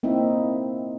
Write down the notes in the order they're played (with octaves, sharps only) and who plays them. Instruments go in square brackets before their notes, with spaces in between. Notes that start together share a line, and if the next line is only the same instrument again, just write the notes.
[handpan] A#3 C4 D#4 E4 E5